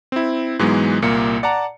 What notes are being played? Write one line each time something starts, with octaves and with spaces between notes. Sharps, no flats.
C4 E4
G#2 E3 F#3 G#3 B3
C2 A#2 A#3 C#7
D5 F#5 A5 A#5